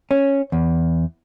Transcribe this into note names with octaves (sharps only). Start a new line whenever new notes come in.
C#4
E2